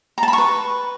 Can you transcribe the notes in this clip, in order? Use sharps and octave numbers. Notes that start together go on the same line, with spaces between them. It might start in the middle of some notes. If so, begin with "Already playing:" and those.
A#5
A5
B5
C#6
B4